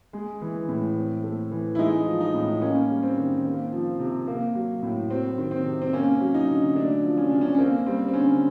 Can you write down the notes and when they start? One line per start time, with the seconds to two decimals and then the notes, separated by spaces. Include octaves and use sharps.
0.13 G#3
0.41 E3
0.68 A2
0.96 C4
1.24 A3
1.51 E3
1.75 E4
1.79 G#3 D#4
2.06 F3
2.21 D#4
2.34 A2
2.62 A#3 C#4
2.90 G3
3.03 C4
3.17 D#3
3.45 A#3
3.72 F3
4.00 C3
4.27 A#3
4.55 F#3
4.82 A2
5.10 F#3 C4
5.38 D#3
5.51 C4
5.65 C3
5.82 C4
5.93 A#3 C#4
6.21 F#3
6.34 D#4
6.48 D3
6.75 A3 D4
7.04 F3
7.17 C#4
7.30 C3 D4
7.41 C#4
7.55 C#4
7.58 A#3 C4
7.86 G3 C4
8.08 C4
8.13 D3 C#4